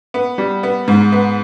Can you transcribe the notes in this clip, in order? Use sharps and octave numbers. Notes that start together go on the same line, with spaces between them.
B3
G3
B3
G#2
B3